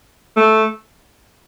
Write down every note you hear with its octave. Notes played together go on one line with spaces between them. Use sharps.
A3